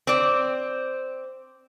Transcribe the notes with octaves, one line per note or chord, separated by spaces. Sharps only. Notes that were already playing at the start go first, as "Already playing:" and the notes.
C4 D5